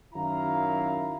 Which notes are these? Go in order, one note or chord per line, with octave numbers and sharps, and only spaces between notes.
F#2 D#3 E4 F5 A#5